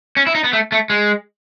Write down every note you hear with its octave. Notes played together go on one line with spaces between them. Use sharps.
C#4
E4
D#4
B3
A3
A3
G#3